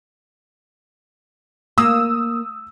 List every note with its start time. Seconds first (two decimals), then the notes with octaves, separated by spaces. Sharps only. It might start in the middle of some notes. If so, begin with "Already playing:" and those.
1.78 A#3 D#6 E6